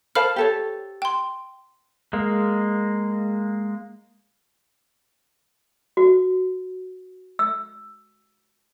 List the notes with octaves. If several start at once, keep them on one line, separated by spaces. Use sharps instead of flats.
A#4 C5 F5 A5 B5 F6
G4 A4 C#5
G5 C6
G#3 A#3
F#4
E6